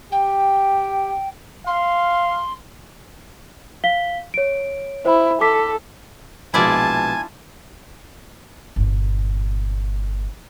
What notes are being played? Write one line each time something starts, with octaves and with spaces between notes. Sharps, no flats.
G4 G5
F5 C6
F5 B6 G7
C#5 D7
E4 C5 B5
A4 D6 B6
A#1 B2 G#3 E4 F4 D5 G#5 A5
G1 A#2